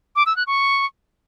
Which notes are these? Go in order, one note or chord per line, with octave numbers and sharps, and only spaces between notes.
D6
E6
F#6
C#6